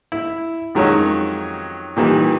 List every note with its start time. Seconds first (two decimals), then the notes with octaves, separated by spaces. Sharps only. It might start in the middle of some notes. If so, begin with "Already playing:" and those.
0.12 E4
0.75 F2 D#3 F#3 G#3 C#4
1.97 A#2 D#3 E3 G3